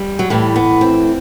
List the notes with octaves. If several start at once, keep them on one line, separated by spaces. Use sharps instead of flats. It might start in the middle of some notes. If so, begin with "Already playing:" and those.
Already playing: G3
F#3
A2 E3 G3
B3
C4